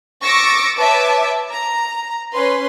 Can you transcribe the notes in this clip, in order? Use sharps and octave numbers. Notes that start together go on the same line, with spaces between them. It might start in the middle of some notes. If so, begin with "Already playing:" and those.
C#6 D6 E6 A6 A#6 C#7
B4 C#5 E5 A5 D6
A#5
C#4 B4 C6